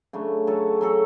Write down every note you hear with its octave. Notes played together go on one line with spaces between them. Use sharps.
C#3 F#3 A3 D4
F#3 C#4 F#4 A4
F#3 C#4 F#4 A4